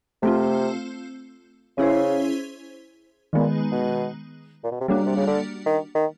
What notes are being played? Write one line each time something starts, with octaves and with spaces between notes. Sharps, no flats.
C3 A3 C4 F4
C#3 C#4 E4 G#4 C5
A#2 D#3 G#3 B3
B2
A#2
B2
C3
C#3 G3 A#3 D4 F#4
C3
C#3
D3
D#3
D#3